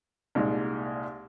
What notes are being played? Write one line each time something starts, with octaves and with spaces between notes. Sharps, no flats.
C2 A#2 G#3 D#4